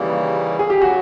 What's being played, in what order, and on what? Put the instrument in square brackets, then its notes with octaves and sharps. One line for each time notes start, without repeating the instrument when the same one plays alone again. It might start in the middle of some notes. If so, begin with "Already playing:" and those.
Already playing: [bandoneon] D#2 C#3 E3 G3 A#3
[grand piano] G#4
G4
[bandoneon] C#3 F#3 [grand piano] F#4